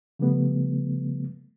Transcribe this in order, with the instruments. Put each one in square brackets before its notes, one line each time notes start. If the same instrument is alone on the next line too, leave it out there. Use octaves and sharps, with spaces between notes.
[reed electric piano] C#3 F3 G3 A3 B3